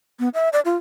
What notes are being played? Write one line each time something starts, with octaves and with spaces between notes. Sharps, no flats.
B3
E5
D5
F4